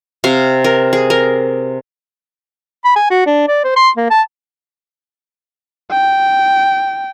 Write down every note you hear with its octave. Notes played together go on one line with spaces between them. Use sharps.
C3 F5
A#4
G#4
A#4
B5
G#5
F#4
D4
D5
C5
C6
A#3
A5
G5